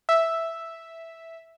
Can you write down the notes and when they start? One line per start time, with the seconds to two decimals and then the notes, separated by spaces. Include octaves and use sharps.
0.09 E5